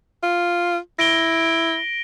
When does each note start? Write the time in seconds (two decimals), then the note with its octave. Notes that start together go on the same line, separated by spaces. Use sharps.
0.23 F4
0.99 E4 A#6 D7 G7